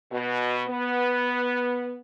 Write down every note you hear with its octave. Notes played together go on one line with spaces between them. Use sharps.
B2
B3